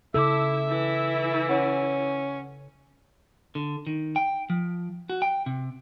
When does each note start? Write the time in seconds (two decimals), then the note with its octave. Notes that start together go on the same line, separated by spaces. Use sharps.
0.14 C#3 E4 A4 E5 D6 E6
0.69 E3 E4
1.49 C#4 C#5 F#5
3.55 D3
3.87 D#3
4.16 G5
4.50 F3
5.10 F#4
5.22 G5
5.46 C3